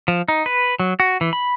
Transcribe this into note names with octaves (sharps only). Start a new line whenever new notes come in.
F3
D#4
B4
F#3
F#4
E3
B5